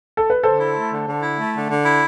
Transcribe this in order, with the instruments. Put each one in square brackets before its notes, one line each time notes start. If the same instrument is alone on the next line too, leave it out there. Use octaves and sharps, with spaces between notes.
[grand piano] A4
B4
[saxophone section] D3 [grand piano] A4 C5
[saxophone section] E4
A3
D3
D3
E4
A3
D3
D3
E4